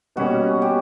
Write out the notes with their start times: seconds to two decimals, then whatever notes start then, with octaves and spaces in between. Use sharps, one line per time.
0.16 B2 G3 A#3 C#4 F#4
0.62 G4